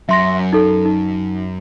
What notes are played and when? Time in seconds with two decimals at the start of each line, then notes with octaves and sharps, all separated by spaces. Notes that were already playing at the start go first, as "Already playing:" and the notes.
0.09 F#2 E5 C6 A#6
0.53 D#4 A4
0.85 D#4